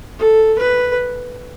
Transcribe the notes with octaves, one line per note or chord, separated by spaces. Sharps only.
A4
B4